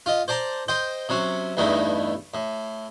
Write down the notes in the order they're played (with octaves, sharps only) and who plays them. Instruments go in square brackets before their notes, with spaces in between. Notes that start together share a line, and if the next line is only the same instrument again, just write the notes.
[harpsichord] F4 D#5
C5 D5 A5 A#5
C5 D#5 G5
C3 F#3 C#4
E2 G2 A3 D#4 E4
A2